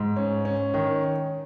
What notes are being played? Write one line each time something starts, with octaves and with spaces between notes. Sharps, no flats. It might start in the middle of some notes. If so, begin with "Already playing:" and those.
Already playing: G#2
C#4
C#4
D#3